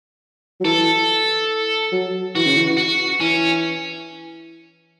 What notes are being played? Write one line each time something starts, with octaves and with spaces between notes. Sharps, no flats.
F#3
E3 A4
F#3
E3 F#4
C#3
E3
F#4
E3 C#4